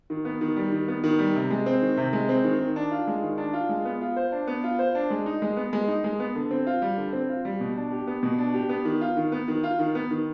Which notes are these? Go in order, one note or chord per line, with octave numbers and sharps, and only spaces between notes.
D#3
B3
D#3
G3
D#3
B3
D#3
G3
C3
G#3
C4
D#3
C3
G#3
C4
D#3
D#3
D4
F4
G#3
D#3
D4
F4
G#3
B3
F4
C5
D4
B3
F4
C5
D4
G#3
D#4
G#3
B3
G#3
D#4
G#3
B3
D3
C4
F4
G3
D3
C4
F4
G3
B2
D4
G4
B3
B2
D4
G4
B3
D#3
F4
D#3
B3
D#3
F4
D#3
B3
D#3